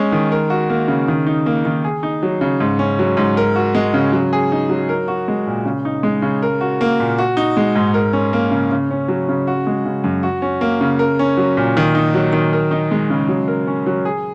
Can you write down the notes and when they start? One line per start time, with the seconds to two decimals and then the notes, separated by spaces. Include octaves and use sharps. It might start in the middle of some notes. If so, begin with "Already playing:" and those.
Already playing: G#3 C#4
0.12 D#3
0.32 A#4
0.50 F#4
0.70 A#3
0.88 C#3
1.08 D#3
1.27 D#4
1.46 A#3
1.65 D#3
1.84 G#4
2.03 D#4
2.23 F#3
2.41 C#3
2.60 G#2
2.79 C#4
2.99 F#3
3.17 G#2
3.37 A#4
3.55 F#4
3.75 G#3
3.94 C#3
4.12 F#3
4.33 G#4
4.52 D#4
4.70 F#3
4.89 A#4
5.08 F#4
5.28 G#3
5.47 A#2
5.65 C#3
5.85 D#4
6.03 G#3
6.22 C#3
6.43 A#4
6.61 F#4
6.81 A#3
7.00 A#2
7.18 F#4
7.37 D#4
7.57 G#3
7.76 G#2
7.94 A#4
8.13 C#4
8.33 A#3
8.51 C#3
8.72 C#3
8.91 C#4
9.09 F#3
9.29 C#3
9.47 F#4
9.67 G#3
9.85 C#3
10.04 F#2
10.23 F#4
10.42 C#4
10.61 A#3
10.81 C#3
10.99 A#4
11.19 C#4
11.38 F#3
11.57 A#2
11.77 D#3
11.95 D#4
12.14 F#3
12.33 D#3
12.53 A#4
12.71 D#4
12.91 G#3
13.10 C#3
13.29 F#3
13.48 A#4
13.67 C#4
13.87 F#3
14.05 G#4